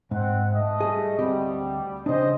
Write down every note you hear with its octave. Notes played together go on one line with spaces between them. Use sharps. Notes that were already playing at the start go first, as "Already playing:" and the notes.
G#2 C4 F#5
A3 D#5
G3 G#4
D2 G3 C4 G4
C#3 D4 C5 D#5